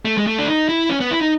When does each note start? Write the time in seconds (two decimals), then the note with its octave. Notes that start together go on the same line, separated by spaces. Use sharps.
0.05 A3
0.18 G#3
0.27 A3
0.38 D4
0.47 D#4
0.69 E4
0.89 C#4
1.00 B3
1.11 E4
1.21 D#4